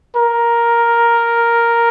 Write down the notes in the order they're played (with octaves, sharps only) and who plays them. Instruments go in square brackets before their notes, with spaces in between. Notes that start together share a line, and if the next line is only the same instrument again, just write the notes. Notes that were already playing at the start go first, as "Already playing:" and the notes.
[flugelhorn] A#4